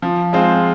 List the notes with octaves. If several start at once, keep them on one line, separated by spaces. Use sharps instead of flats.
F3
G#3 C4 F4 C5